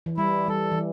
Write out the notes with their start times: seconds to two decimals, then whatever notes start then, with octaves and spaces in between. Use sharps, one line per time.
0.06 E3
0.17 G3 E4
0.48 G3 A4
0.71 E3